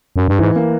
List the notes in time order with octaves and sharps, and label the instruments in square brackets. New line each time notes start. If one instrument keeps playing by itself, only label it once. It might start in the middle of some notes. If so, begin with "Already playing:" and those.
[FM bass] F#2
G2
[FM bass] G#2 [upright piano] E3
[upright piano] A#3